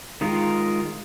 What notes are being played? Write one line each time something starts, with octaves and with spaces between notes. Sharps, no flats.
D#3 G#3 F4 A#4